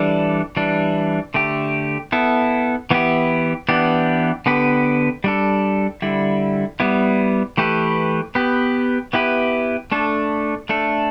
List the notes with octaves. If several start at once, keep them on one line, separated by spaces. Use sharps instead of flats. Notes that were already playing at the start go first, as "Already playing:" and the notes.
Already playing: E3 G3 D4 A4
E3 G3 D4
D3 A3 G4
B3 E4 A4
E3 B3 E4 G4
E3 B3 D4 G4
D3 B3 G4 B4
G3 D4 A4
D3 G3 E4
G3 B3 E4
E3 A3 G4 B4
B3 G4 B4
B3 E4 G4 B4
A3 D4 A4
A3 D4 A4